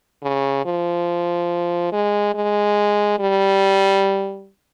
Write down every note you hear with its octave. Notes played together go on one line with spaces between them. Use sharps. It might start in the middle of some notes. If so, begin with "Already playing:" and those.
C#3
F3
G#3
G#3
G3